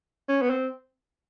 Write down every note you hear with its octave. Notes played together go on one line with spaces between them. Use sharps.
C#4
B3
C4